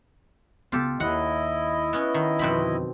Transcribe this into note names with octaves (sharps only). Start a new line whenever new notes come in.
C#2 B3 F4 G4 A4
D#2 E4 D#5 F#5
B3 C#4
D#3
F2 B2 D3 C4 B5